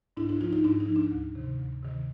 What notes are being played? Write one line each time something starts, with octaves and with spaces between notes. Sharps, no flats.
G#2 D4 E4
D4 E4
F3 D#4 F4
D#4 F4
G#2 D4 E4
D#4
F3
D4
D2
C3 D#3
D2
C3 D#3